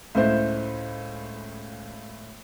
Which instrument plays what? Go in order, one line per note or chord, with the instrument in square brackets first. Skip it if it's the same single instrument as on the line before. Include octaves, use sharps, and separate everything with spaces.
[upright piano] C#2 A2 E4 C5